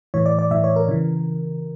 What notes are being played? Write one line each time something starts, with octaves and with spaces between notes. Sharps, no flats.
A2 E3 C#5
D5
D5
A2 E3 E5
C#5
A#4
C#3 E3